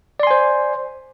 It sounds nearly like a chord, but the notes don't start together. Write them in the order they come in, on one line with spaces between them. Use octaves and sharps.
D5 C6 G#5 C5